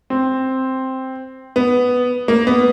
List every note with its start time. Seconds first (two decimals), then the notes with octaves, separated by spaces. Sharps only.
0.10 C4
1.56 B3
2.28 A#3
2.47 B3